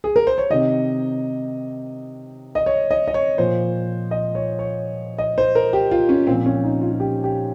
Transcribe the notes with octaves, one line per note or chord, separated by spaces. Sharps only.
G#4
A#4
C5
C#5
C3 D#3 D#5
D#5
C#5
D#5
D#5
C#5
A#2 F3 C5
D#5
C#5
C#5
D#5
C5
A#4
G4
F4
C#4
A#2 F3 C4
C#4
D#4
F4
F4
G4
G4